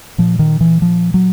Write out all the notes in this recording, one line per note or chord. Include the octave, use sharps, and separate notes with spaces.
A#2 F3
D#3
E3
F3
F#3